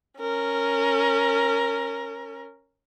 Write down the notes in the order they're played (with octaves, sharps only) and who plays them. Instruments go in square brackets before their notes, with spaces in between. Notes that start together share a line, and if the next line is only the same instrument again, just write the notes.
[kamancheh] C#4 A#4